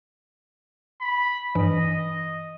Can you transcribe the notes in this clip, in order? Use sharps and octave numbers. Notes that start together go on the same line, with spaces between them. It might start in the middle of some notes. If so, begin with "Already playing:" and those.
B5
G2 E3 D#5